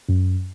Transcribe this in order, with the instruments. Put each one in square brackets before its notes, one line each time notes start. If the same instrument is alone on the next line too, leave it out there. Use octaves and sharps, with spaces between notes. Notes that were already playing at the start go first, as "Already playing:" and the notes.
[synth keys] F#2